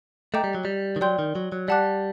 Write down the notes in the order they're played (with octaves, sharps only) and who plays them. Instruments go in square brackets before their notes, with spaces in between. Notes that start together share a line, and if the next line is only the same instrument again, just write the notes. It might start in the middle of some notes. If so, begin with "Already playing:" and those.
[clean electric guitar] A3 [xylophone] D#5 G5 A#5 D6 G6
[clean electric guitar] G3
F#3
G3
D#3
[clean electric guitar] F#3 [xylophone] D5 G5 C6 G6
[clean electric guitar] D#3
F#3
F#3
[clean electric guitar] G3 [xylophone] D5 F#5 A5 D6 F#6